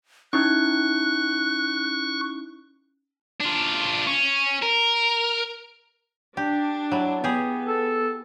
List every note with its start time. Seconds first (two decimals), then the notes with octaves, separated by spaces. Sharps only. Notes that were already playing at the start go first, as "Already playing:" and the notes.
0.33 C#4 D#4 E4 C#6 F#6
3.41 D4 F4
4.07 C#4
4.62 A#4
6.37 D4 G4
6.91 F#3 E4
7.24 B3 G4 G#4
7.68 A4